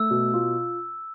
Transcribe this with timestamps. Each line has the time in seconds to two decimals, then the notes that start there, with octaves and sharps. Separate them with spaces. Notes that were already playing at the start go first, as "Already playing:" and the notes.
Already playing: A3 E6
0.11 B2
0.34 F4